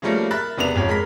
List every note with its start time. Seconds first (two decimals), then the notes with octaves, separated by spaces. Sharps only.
0.02 C#3 F3 G3 A3 A#3
0.31 A#4 E5 B5 F#6 A6
0.58 E1 C3 B3 D4 E5 F7
0.76 G#1 F2 C#5
0.88 G#3 A#4 B5 B6